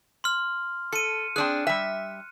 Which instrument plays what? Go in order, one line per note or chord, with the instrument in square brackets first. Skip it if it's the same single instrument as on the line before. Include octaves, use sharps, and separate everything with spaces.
[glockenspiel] C6 F6
[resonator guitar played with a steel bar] A4 [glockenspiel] C#7 D#7
[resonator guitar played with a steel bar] C4 D4 G#4 [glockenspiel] F#6
[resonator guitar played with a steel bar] G3 E5